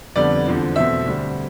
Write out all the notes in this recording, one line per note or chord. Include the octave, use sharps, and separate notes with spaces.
F2 D3 G3 B3 D5
E2 D3 F3 C4
E2 B2 A3 C4 E5
D2 D3 G3 C4